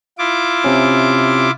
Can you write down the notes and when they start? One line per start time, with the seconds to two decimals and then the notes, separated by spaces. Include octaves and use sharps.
0.18 E4 F4 D6
0.64 C3 C#4